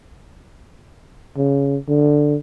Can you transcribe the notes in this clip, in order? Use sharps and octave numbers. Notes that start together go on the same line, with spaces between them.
C#3
D3